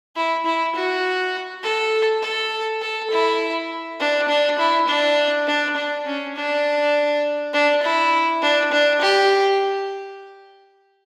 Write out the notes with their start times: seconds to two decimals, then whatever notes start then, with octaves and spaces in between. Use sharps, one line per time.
0.16 E4
0.46 E4
0.75 F#4
1.63 A4
2.22 A4
2.81 A4
3.11 E4
4.00 D4
4.29 D4
4.59 E4
4.88 D4
5.47 D4
5.76 D4
6.06 C#4
6.36 D4
7.54 D4
7.83 E4
8.42 D4
8.72 D4
9.02 G4